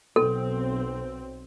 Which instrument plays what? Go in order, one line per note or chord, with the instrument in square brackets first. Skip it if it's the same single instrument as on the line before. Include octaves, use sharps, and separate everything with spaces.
[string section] B1 C4 [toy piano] A4